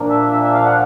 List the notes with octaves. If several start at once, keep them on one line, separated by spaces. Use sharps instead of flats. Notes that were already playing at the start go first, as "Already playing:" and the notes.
Already playing: A#2 F3 A#3 D4
E5
E5
E5
F5
F#5